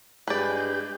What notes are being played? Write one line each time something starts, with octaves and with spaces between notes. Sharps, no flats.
G2 G#3 D4 G4 G#4 B4 D5 G6